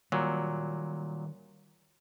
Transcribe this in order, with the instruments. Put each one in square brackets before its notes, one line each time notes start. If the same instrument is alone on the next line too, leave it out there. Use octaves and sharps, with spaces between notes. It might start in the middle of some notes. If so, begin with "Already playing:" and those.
[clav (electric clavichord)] A#2 F#3 [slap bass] D#3 G3